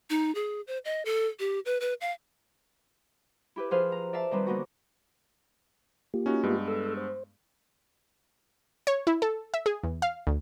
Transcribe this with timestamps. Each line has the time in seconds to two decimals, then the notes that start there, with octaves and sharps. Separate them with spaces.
0.10 D#4
0.35 G#4
0.67 C5
0.85 D#5
1.05 A4
1.40 G4
1.66 B4
1.81 B4
2.01 F5
3.56 E4 G4 B4
3.71 F3 G#4 B4 C5 F5 F6
3.92 A#5
4.13 D5 E5 F5 A5
4.31 D#3 G3 C4 B4
4.46 D3 A#3 B3 F#4
6.14 A#3 F4 G4
6.26 C#4 D#4 F#4
6.43 G2 G#3 B3
6.68 A4 E6
6.97 C5
8.87 C#5
9.07 E4
9.22 A4
9.54 E5
9.66 G#4
9.84 E2
10.02 F5
10.27 D2